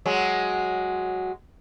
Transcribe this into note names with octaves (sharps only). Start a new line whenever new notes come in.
F#3 G#3